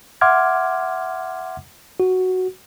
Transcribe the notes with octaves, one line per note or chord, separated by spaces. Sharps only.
E5 F#5 C6 D6 F6 G#6
F#4